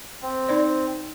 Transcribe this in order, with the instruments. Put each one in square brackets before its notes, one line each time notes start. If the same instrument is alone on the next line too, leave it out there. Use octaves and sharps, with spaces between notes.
[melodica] C4
[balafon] D#4 C5 D5